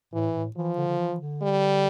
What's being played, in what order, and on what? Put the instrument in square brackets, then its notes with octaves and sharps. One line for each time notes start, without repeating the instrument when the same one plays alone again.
[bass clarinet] A2 [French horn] E3
[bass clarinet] A2
[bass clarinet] E3 [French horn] F3
[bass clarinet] D3
D3
E3
E3
D3
[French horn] G3